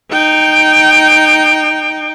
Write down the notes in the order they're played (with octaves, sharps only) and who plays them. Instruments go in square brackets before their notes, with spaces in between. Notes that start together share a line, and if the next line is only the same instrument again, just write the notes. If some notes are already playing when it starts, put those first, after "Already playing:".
[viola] D#4 G5